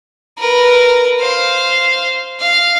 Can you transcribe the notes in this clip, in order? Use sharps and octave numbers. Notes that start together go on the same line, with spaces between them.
A#4 B4
C5 F5
F5